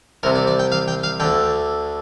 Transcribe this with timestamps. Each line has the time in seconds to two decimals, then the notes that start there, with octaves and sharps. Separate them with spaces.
0.23 C2 C3 A#4
0.36 D5
0.47 D5
0.59 G5
0.72 F5
0.88 G5
1.03 F5
1.20 D2 D3 G5